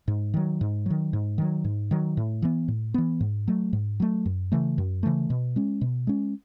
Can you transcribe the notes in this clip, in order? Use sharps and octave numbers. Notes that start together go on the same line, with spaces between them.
G#2
D#3 F#3
G#2
D#3 F#3
G#2
D#3 F#3
G#2
D#3 F#3
A2
E3 B3
A2
E3 B3
G#2
F#3 A3
G#2
F#3 A3
F#2
C#3 E3 A3
F#2
C#3 E3 A3
B2
G#3 C#4
B2
G#3 C#4